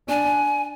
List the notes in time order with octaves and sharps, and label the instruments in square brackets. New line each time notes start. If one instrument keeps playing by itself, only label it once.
[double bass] D4 [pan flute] G#5